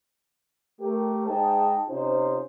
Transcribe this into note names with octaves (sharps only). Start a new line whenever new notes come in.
A3 G4 A#4
G#3 D#4 G#4 C5 G5 A5
C3 C#4 D#4 F4 C5